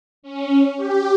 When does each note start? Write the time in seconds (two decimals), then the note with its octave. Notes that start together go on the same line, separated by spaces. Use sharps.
0.23 C#4
0.77 G4